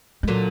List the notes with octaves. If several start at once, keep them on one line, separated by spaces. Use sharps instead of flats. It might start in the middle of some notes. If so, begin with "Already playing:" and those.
G#3
A#2 D3 F#3